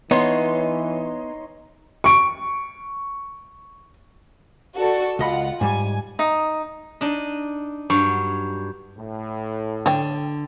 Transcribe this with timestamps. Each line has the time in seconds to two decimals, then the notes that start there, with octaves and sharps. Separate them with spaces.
0.11 E3 B3 D#4 C#5 C6
2.04 C#6 D7
4.76 F#4 A4 D5
5.19 C#2 F4 D#5 F#5 B5
5.61 G#2 G3 G#5
6.19 D#4
7.01 D4 D#4 D#5
7.90 G2 F#3 C#6
8.97 A2
9.86 D3 A4 C#5 G5